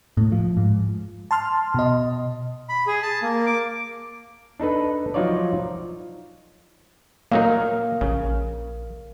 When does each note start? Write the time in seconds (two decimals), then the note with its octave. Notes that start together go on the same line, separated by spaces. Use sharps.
0.17 A2
0.32 F3
0.57 G#2
1.31 A5 C6 F6
1.74 B2 D#5
2.69 B5
2.87 G#4
3.03 A5
3.22 A#3
3.46 D6
4.60 D4 D#4 A4 B4
5.14 F3 F#3 D#4 F4 C#5 D5
7.32 A#2 F#3 A#3 D#4 A#4 F5
8.01 A#1 C#3